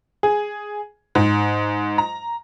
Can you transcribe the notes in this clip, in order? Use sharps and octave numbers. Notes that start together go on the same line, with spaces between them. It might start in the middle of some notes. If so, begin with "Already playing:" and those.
G#4
G#2
A#5